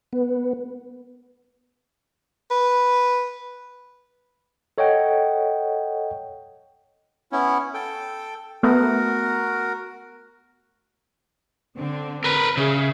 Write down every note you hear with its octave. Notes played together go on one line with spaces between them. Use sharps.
B3
B4
A4 C#5 D#5 F#5 G5
B3 C#4 E4
A4 G5
A3 B3 F#4 A#4
D3 C4 D4
A#4 B4
C#3 G#4 E5